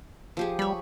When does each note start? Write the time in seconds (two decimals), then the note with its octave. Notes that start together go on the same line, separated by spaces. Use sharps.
0.37 F3 G4 G#4
0.59 G3 C#5 B5